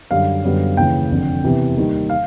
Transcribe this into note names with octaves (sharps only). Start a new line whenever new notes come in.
F#2 D3 G3 F5
F#2 D3 G3 B3
D#2 C#3 E3 G5
F1 F2 D3
E2 C3 E3
D#2 D#3 G3
F5